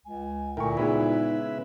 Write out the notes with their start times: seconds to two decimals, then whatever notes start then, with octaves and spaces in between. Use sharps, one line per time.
0.05 C#2 G#5
0.57 D2 A#2 E4 A#4 G5 C#6
0.77 C#3 G#3 B3 D#4 E4 B4 E5